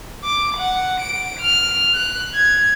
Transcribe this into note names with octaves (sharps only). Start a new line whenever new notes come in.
D6
F#5
D7
F6
F#6
G#6